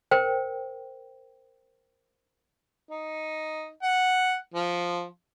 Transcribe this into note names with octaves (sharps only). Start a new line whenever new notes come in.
A#4 C5 G5
D#4
F#5
F3